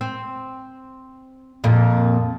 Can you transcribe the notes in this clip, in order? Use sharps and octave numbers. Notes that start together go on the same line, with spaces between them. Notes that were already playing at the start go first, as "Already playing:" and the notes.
C4
F2 A#2